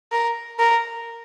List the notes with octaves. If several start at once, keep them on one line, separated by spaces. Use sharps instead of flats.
A#4
A#4